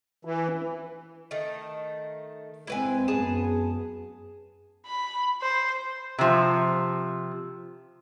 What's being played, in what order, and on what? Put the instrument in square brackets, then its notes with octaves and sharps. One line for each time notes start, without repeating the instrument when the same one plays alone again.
[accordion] E3
[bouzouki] D#3 A3
[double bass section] G#3 C4 [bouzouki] E4 B4 G#5
[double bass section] F#2 B3 [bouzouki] G#4 G#5 A5
[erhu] B5
C5
[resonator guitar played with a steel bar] C3 F3